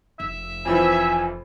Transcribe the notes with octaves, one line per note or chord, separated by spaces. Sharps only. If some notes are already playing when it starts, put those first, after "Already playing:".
F1 E5
F2 E3 F3 G#5